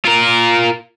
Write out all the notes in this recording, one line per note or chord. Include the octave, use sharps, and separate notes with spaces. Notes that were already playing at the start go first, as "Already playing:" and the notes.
F4 A#4